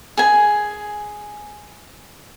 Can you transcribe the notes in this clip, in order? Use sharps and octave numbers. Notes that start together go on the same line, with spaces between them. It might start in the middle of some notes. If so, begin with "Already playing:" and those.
G#4 G#5